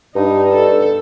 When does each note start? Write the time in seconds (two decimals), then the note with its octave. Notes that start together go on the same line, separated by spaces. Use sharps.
0.15 G2 D#4
0.52 A4